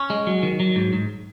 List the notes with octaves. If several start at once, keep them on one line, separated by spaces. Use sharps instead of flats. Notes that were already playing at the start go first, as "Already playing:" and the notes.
Already playing: C#4
G#3
F#3
D#3
F#3
G#2
G#2